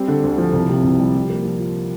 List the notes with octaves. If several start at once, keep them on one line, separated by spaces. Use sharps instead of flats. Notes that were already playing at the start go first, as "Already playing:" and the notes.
Already playing: G3 C4
D3
D2
F3
C2
C3
C2
G3
F3
A#3
F3
F4